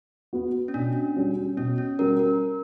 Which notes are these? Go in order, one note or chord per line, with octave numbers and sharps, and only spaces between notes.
B3 F#4
C#4
B2 D4
G3 C#4 F#4
B2 C#4
C#4
G3 C#4 F#4 A#4
A#4